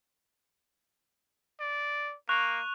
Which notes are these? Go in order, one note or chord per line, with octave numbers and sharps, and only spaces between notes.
D5
A#3 C#6 F#6 F7